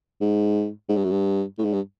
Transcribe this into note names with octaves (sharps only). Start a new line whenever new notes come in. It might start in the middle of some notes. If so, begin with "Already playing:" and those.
G#2
G#2
G2
F#2
G2
A2
G#2
G2